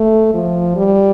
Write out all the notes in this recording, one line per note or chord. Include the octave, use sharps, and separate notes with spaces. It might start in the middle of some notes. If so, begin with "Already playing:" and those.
Already playing: A3
F3
G3